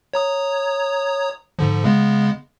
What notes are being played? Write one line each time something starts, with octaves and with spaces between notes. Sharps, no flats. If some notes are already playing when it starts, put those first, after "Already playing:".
C#5 A#5 D#6
G#2 D3 F3
C#3 G#3 B3